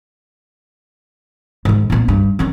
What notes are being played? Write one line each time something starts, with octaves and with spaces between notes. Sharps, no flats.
G#2 D#3
A#2 B3
G2
D#3 C#4